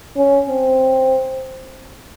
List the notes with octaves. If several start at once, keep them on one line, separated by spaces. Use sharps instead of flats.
C#4
C4